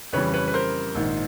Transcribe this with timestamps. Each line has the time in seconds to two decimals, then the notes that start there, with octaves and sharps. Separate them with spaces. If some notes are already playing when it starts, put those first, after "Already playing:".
0.13 F2 C#3 E3 G3 B4 C#5
0.34 B4 C#5
0.48 B4
0.54 A#4 C5
0.95 A#1 G#2 D#3